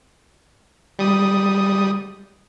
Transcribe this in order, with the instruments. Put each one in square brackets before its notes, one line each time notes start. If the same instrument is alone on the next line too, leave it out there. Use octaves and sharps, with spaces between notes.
[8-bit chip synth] G3 D#6